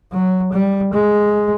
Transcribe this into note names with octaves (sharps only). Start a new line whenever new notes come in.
F#3
G3
G#3